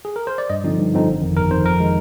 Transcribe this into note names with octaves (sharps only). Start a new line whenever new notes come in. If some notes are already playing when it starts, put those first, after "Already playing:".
G#4
A#4
C5
D5
G2 D#5
D3 F3 C4 D#4
G2
D3 F3 C4 D#4
G1
F2 D#3
G1 A#4
F2 D#3 C5
F2 A#4
D#3 G#3 D#4